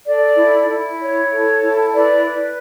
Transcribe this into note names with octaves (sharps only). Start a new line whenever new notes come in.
A4 D5
E4
E4
C#5
A4
E4
B4 D5
B4